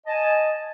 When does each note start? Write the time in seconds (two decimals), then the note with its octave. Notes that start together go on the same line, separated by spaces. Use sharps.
0.04 D#5
0.07 A5
0.10 G#5